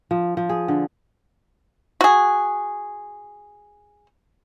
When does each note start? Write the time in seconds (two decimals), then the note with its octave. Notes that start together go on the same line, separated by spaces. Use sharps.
0.11 F3
0.37 F3
0.49 G#4
0.68 D3
2.01 F#4 G#4